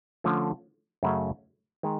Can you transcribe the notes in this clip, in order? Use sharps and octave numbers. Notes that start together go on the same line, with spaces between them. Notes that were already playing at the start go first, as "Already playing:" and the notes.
D3 F3 A3 C#4
F#2 C#3 F#3 A3 C#4
D#3 G#3